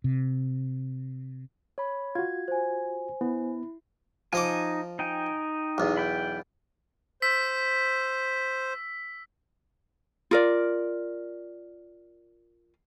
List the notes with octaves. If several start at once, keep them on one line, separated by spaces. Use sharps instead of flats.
C3
C#5 B5
F4 F#4 G#6
C5 G#5
B3 E4
F3 D#4 D#5 G#5 D6
D#4 G5 G#5
B1 E2
G5 B5
C5 E6 B6
F4 A#4 D5